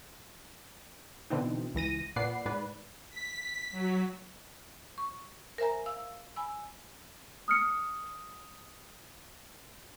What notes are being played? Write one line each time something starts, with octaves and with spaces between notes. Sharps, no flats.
B2 D3 E3 C4 D#4
C#2 E3 A#6 D#7
A#2 B4 D5 F#5 C7
G#2 B4 D5
B6
F#3
C#6
A#4 C5 E5 G#5 A#5
F5 E6
G#5 B5 E6
D#6 F6 C#7